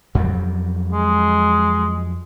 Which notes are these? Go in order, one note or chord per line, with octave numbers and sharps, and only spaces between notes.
F2 F#3 G3
G#3